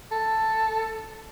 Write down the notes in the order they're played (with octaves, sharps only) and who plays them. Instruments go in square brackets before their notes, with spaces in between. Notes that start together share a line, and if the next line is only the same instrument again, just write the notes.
[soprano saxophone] A4